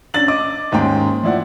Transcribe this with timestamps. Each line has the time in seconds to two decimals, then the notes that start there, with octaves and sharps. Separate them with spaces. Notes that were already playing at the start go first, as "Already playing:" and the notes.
0.14 C#4 D4 A6 F#7
0.28 D#5 D6
0.72 D#2 G#2 C#4 G5 C6
1.23 F3 E4 D5 F#5